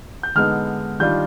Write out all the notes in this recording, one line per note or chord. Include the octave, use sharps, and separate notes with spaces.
G6
D3 G#3 B3 D#4 F6
D#3 G3 D4 F4 G6